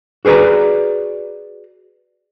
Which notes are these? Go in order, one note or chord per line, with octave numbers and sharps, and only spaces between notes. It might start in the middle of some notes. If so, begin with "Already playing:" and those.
F#4 G#4 B4 D5 A#5